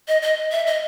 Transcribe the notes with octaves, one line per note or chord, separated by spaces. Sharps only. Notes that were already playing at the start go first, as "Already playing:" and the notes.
D#5
D#5
E5
D#5